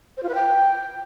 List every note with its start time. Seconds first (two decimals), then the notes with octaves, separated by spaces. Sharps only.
0.17 C5
0.23 F4
0.29 B4
0.35 G5